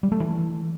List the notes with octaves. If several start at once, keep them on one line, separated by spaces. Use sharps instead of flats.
G3
A3
E3